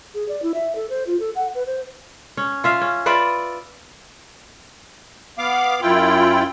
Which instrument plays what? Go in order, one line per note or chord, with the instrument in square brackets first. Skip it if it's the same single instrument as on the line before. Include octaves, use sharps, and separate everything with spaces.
[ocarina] G#4
D5
E4
E5
A4
C5
F4
A4
F#5
B4
C5
[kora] C#4
F4 E5 F5
C#4
F4 B4 D5 E5
[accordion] B3 F5 D6
F#2 E4 F4 G5